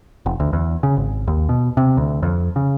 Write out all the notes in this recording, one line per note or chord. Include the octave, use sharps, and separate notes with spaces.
F1
D2
E2
C#3
G#1
D#2
B2
C3
D2
F2
C#3